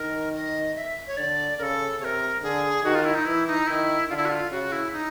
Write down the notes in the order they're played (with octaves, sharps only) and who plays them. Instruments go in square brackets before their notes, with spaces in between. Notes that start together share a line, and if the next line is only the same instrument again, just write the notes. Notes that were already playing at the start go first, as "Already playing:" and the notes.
Already playing: [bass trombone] D#3 [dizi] A#4
[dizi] D#5
E5
C#5
[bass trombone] D3 [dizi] D5
[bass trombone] C#3 [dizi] A4 A#4
[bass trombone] C3 [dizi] C#5
[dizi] A#4
[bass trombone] D3 [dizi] G#4
[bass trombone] D#3 [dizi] F#4
[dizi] F4
E4
D#4
[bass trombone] E3 [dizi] E4
[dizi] D#4
[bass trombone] D#3 [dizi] E4
[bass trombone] D3 [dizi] F4
[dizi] E4
F#4
F4
[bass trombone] C#3 [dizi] F#4
[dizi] E4
D#4